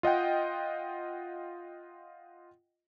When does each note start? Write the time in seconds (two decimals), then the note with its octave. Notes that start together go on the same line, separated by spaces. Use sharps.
0.03 F4 D#5 F#5 G5